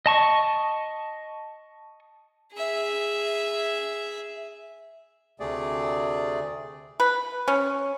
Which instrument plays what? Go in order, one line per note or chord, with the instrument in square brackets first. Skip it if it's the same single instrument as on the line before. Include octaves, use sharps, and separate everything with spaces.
[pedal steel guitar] D#5 A5 C#6
[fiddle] G#4 E5
[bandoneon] D2 C3 A3 G#4 D5
[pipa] B4
C#4